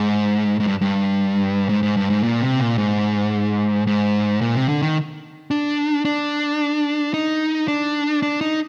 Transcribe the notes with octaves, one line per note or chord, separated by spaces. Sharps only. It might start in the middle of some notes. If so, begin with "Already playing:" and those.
Already playing: G#2
G#2
G2
G2
G#2
G#2
G2
G#2
A#2
C3
A#2
G#2
G#2
A#2
C3
D3
D#3
D4
D4
D#4
D4
D4
D#4